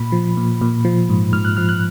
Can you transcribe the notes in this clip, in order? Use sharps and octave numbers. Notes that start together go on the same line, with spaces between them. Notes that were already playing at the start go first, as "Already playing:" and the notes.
Already playing: A#2 B5
F3
A#2
A#2
F3
G#2
G#2 F6
F#6
F3 F6
F#6